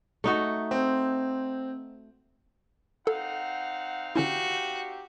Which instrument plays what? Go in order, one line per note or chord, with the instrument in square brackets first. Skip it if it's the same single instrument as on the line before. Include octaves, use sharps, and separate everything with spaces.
[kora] A3 D#4 F#4
[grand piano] C4
[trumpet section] C4 D#4 F5 [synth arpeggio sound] A4 [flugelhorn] F#5
[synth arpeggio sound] D3 C#4 E4 [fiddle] F#4 [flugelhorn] G4